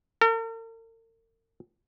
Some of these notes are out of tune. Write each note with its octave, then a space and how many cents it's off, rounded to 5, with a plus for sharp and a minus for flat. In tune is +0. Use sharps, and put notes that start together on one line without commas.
A#4 -45